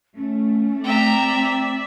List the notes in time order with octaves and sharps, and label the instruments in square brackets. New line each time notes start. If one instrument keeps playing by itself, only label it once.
[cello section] A3 [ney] C#4
[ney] C4 [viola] D5 E5 [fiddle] G5 A#5